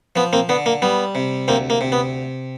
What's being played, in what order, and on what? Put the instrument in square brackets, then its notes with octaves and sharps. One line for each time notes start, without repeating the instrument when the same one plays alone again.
[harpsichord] F3 B3
A#3 C4
D3 B3
A#3
G3 B3
C3
D2 A#3 C4
A#3
C3
B3